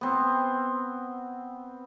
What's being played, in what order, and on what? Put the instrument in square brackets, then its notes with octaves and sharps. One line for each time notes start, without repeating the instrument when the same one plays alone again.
[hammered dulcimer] B3 C4